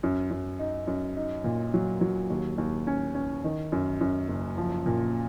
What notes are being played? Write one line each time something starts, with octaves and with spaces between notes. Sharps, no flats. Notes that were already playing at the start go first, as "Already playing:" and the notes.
F#2
F#2
D#4
F#2
D#4
A#2
F#3
F#3
D#2
D#2
C#4
C#4
D#3
F#2
F#2
F#1
F3
A#2